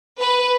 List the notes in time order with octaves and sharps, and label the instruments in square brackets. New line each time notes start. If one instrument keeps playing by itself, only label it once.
[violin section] B4